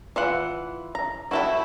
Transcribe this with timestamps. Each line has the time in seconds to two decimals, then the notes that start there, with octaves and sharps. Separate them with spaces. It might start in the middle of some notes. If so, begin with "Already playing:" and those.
0.16 E3 F4 F#5
0.95 A#5
1.31 E4 F#4 A4 G5